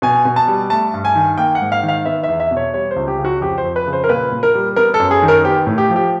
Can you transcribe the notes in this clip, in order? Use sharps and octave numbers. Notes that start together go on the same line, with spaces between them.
B2 G#5
B2
A5
G3
A3 A5
G2
G#5
D#3
A#3 G5
F#5
G#2
F5
D#3
F5
B3 E5
E5
E2
E5
B2
C#5
G3 C#5
C5
C#2
G4
C#3
F#4
F2 G4
C5
F2
B4
C#3
C5
A#4
A#2 B4
A#2
A#4
G3
B3 A#4
A4
F#2
G#4
D#3
A#4
B3 G4
A2
G4
F3
G4